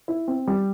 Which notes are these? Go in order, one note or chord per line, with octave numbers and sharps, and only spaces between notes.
E4
C4
G3